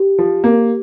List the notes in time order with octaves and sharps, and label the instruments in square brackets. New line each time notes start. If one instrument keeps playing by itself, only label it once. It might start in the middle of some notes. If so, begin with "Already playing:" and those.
Already playing: [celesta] G4
[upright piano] F3
A#3